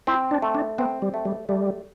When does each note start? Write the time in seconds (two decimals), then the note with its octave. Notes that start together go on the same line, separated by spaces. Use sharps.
0.07 C4 E4
0.31 D4
0.42 A3
0.55 D4
0.78 B3 C4
1.02 G3
1.14 A3
1.25 G3
1.49 G3 A3